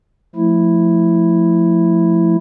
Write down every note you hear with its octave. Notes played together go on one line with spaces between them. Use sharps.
F3 A3 E4